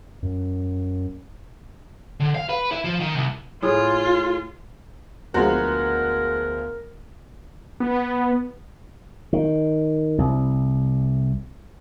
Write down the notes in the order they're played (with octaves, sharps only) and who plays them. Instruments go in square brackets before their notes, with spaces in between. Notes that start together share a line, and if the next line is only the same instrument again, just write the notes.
[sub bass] F#2
[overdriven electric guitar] D3
F5
B4
E4
F3
D#3
C2
[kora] A2 G#4 [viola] F4
[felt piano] D2 B3 [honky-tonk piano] F3 G#3 F#4 [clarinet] A#4 [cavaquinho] A#5
[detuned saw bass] B3
[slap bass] D#3
C2